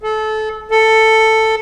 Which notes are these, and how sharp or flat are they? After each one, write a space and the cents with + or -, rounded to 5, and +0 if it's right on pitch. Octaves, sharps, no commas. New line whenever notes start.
A4 -25
A4 +10